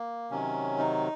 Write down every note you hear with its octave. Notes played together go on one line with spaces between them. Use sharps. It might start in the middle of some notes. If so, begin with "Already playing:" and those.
Already playing: A#3
C3 D#3 F#3 C#4
D#4